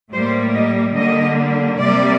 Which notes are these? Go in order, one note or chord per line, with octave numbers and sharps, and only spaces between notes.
A2 G3 A#3 C5
D#5
D3 G3 A#3 D#5
C3 G3 A#3 D5